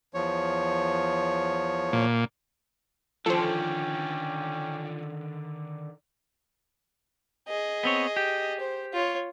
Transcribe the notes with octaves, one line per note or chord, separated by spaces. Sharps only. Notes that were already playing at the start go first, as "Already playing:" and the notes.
E2 F3 C#5
A#2
D3 D#3 F3 C#4 A4 C5 G5
G#4 D#5
B3 C4 C#5
G4
C5
F4 C#5